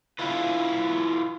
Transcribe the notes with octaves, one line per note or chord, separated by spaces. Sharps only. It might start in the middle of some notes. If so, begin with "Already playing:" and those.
E4 F4 B4